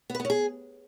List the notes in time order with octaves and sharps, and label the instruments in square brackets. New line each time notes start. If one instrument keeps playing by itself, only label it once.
[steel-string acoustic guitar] B3
B4
B3
C#4
G#4